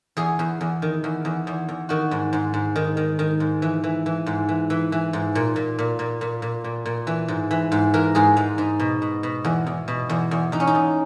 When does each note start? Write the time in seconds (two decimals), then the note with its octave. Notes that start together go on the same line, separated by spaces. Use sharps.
0.17 E2 G#4
0.39 E2
0.61 E2
0.82 D#3
1.04 E2
1.25 E2
1.47 E2
1.69 E2
1.89 D#3 F#4
2.11 G#2
2.33 G#2
2.54 G#2
2.76 D#3
2.97 D#3
3.19 D#3
3.40 G#2
3.62 E3
3.84 E3
4.06 E3
4.26 G#2
4.49 E3
4.70 E3
4.92 E3
5.13 G#2
5.35 A#2
5.56 A#2
5.79 A#2
5.99 A#2
6.21 A#2
6.42 A#2
6.64 A#2
6.86 A#2
7.07 E3
7.28 G#2
7.51 E3
7.72 G#2
7.94 E3 A#4
8.15 G#2 G#4
8.37 G#2 D#4
8.58 G#2 D#4
8.80 B2
9.02 B2
9.23 B2
9.45 E2
9.67 E2
9.88 B2
10.09 E2
10.31 E2
10.52 E2 D#4
10.60 C#4
10.67 D#4
10.75 E2